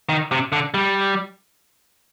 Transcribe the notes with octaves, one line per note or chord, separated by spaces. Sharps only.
D#3
C3
D3
G3